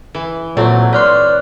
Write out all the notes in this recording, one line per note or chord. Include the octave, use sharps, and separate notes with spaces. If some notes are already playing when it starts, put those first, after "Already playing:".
E3
A#2 F#3 A3 C4
B4 C#5 D5 C6 F6 F#6